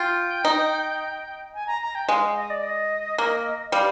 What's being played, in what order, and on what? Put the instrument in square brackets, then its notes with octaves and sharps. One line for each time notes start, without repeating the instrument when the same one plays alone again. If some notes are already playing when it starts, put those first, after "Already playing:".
Already playing: [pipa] F4 [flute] G5
[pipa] D#4
[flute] G#5
A#5
A#5
G5
[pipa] G#3 [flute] F5
[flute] D#5
D5
D#5
[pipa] A#3
[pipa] G3 [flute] F5